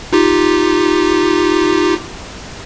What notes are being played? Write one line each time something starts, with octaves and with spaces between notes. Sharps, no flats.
D#4 F4 G4